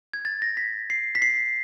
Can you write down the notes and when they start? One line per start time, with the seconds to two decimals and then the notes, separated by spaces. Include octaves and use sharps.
0.13 G#6
0.25 A6
0.42 A#6
0.57 B6
0.90 C7
1.15 B6
1.22 C7